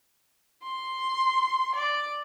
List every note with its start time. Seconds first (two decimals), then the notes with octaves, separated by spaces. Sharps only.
0.63 C6
1.75 D5